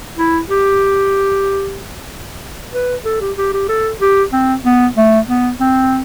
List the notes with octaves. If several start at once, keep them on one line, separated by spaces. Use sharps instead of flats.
E4
G4
B4
A4
G4
G4
G4
A4
G4
C4
B3
A3
B3
C4